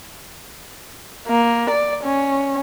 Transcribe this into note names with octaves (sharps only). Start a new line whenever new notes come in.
A#3
D5
C#4